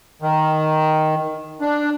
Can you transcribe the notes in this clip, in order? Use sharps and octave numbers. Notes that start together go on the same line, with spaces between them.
D#3
D4